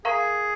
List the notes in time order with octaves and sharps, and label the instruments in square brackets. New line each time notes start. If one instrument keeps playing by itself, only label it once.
[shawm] G#4 [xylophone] A#4 F5 A#5 C#6